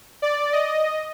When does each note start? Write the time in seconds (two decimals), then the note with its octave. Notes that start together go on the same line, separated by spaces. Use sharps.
0.22 D5
0.53 D#5